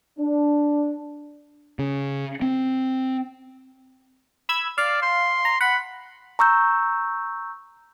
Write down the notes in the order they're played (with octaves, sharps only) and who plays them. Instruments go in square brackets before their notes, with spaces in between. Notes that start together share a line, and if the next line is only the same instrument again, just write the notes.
[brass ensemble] D4
[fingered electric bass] C#3
C4
[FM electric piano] B5 E6 G#6
[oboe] D5 [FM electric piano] F5
[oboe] C6
[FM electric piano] A#5
[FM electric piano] F#5 [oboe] B5
[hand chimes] A#5 C#6 E6 G6